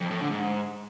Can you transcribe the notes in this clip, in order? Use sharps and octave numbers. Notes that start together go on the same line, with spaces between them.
F2
A2
D3
G#2